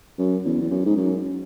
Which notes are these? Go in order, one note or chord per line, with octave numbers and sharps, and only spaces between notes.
F#2
E2
E2
F#2
G#2
F#2